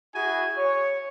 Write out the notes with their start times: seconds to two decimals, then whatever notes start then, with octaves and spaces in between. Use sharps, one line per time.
0.15 E4 F#4 G#4 G#5
0.57 C#5